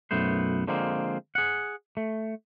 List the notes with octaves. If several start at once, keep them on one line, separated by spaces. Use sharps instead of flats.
B1 F#2 A3 B3 C5
D3 F3 G#3 A#3 C4
G#4 F#5
A3